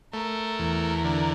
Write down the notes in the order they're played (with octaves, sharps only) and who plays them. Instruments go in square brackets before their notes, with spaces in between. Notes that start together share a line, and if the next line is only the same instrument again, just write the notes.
[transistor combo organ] A3 [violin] A#4
[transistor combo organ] E2
D3